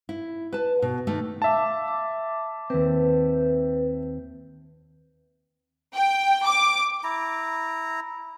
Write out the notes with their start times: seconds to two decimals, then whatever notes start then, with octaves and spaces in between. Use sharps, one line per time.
0.09 E4
0.53 B4 A5
0.82 B2
1.07 D#3 A3 D4
1.42 E5 F5 A5 D6
1.88 D6
2.70 D#2 C4 B4
5.93 G5
6.46 D6
7.04 E4 A#5